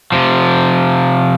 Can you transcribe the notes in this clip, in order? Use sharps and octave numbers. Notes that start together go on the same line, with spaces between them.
C3 F3